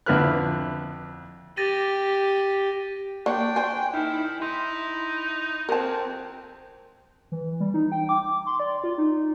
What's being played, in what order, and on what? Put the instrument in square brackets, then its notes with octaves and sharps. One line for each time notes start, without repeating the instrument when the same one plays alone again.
[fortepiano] F2 D3 E4 B4 F6 F#6
[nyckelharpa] G4 [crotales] A6 A#6 D#7
[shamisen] A#3 [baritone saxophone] D4 [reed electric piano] D5 C#6 [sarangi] G5
[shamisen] C5 G#5
[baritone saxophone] D#3 [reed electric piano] D#4 [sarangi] E4
[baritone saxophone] D#4 [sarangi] E4 [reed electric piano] C6
[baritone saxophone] F2 [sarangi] C4 [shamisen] A#4 A5
[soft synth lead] E3
G3
D#4
G5
D6
C6
D5
F4
D#4